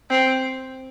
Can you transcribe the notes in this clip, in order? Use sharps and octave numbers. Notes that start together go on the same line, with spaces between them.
C4